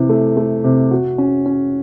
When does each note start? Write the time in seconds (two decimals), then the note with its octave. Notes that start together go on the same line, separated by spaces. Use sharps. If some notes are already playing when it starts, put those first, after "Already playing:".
Already playing: C3 E3
0.09 A3
0.37 A3
0.64 C3
0.91 F#4
1.18 C#4
1.46 C#4